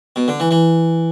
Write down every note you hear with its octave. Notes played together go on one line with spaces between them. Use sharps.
B2
D3
E3
E3